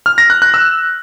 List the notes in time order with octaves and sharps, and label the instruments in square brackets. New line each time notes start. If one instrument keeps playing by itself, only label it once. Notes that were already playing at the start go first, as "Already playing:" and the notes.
[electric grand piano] F6
A#6
F#6
F#6
E6